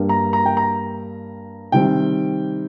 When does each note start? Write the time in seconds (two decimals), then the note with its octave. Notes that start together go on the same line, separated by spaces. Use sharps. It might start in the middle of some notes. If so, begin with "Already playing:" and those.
Already playing: G2 G3 A#3
0.09 A#5
0.33 A#5
0.46 G5
0.57 A#5
1.72 C3 D#3 G3 C4 G5